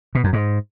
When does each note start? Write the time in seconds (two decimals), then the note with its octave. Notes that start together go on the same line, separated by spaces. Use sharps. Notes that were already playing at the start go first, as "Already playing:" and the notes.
0.15 B2
0.24 F#2
0.33 G#2